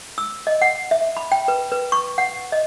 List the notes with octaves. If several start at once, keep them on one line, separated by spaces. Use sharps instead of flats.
E6
D#5
F#5
E5
B5
G5
B4
B4
C#6
F#5
D#5